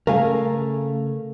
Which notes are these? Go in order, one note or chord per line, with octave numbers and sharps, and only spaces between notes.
C#3 A3 A#4 F5 G#5